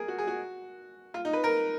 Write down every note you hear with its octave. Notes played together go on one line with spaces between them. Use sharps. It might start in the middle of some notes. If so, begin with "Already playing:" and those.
Already playing: G#4 A#4
F#4
G#4
F#4
F4
D#4
B4
A#4